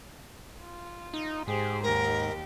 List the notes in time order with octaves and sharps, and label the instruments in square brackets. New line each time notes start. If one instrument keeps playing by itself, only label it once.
[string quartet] F4
[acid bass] D#4
[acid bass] G#2 [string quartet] G4 G#4 C5
[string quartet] D#2 G4 [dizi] A#4